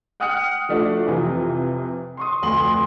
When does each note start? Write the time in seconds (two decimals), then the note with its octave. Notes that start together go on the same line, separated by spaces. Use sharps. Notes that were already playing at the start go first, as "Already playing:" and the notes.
0.20 F#5 G5 D#6 F6 F#6 C#7
0.69 F3 A3 D4 F4 F#4
1.06 F2 C3 E3 F4
2.17 C6 C#6 D#6
2.42 F1 D2 C6 F#7